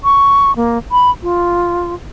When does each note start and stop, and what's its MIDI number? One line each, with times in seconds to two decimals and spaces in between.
0.04 0.54 85
0.56 0.78 58
0.92 1.11 83
1.23 1.94 65